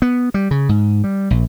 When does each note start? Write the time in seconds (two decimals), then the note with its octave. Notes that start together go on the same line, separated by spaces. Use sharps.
0.02 B3
0.34 G3
0.51 C#3
0.69 G#2
1.04 G3
1.30 A#1